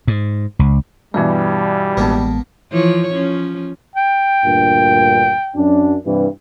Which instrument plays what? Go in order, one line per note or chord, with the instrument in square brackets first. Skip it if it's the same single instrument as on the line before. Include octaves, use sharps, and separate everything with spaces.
[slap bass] G#2
C#2
[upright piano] G2 B2 E3 [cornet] G3 [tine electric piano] D5
[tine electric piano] A1 G#3 A5 [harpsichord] A#3 B3 A#4
[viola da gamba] E3 F3 C#5
F3 C#4
[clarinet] G5
[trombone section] D2 G2 A#2
F#2 D4
G2 C3 E3